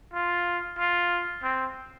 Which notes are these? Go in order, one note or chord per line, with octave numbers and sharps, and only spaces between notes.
F4
F4
C4